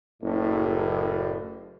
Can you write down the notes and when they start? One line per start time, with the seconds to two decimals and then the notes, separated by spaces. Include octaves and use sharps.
0.23 F#1 A2